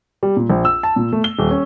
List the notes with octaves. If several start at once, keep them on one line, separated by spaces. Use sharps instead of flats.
G3
A#2
A#1
E6
A5
A#2
A3
G7
D#1
C#4